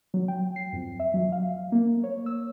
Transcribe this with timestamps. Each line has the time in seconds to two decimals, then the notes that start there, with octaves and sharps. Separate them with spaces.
0.14 F#3
0.28 G5
0.56 C7
0.73 F2
1.00 E5
1.14 F#3
1.32 F5
1.72 A#3
2.04 C#5
2.26 E6